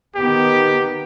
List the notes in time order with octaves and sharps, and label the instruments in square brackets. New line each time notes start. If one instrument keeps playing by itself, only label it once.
[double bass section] D#3 B3 [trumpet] G4